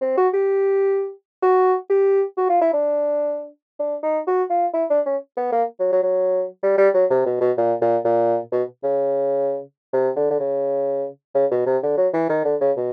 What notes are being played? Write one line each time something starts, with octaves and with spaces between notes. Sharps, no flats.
C4
F#4
G4
F#4
G4
F#4
F4
E4
D4
D4
D#4
F#4
F4
E4
D4
C#4
B3
A#3
F#3
F#3
F#3
G3
G3
F#3
C3
B2
B2
A#2
A#2
A#2
B2
C#3
C3
D3
D3
C#3
C#3
B2
C3
D3
F#3
E3
D#3
D3
C#3
B2